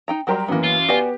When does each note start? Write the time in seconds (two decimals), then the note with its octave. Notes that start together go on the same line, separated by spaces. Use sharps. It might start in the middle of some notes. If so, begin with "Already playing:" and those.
0.08 D#4 G5 A#5
0.27 F#3 G3 F#4 G4 A#4 C6
0.48 F#2 E3 A#3 B3
0.64 F4
0.89 B3 F#4 G4 D5 G#5